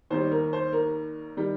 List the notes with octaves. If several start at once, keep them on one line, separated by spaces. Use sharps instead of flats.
D#2 D#3 G3 C5
A#4
C5
A#4
D#3 G3